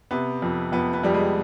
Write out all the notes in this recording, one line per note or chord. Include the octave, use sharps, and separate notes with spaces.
C3 B3
F2
F2 B3
B3
F2 G3
G#3